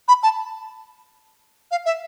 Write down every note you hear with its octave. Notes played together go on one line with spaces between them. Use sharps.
B5
A5
F5
E5